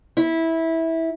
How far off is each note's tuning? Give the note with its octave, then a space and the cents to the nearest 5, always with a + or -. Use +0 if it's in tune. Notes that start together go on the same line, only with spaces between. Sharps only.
E4 -15